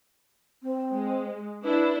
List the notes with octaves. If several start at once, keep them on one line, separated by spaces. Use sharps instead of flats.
C4
G#3
D4 E4 B4